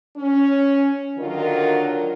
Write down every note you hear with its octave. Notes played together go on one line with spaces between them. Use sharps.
C#4
D3 D#3 F#3 D4 F4 A#4